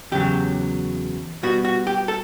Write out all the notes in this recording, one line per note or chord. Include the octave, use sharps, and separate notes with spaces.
E2 C#3 F#3 G4
B2 G3 B3 F#4
F#4
G4
A4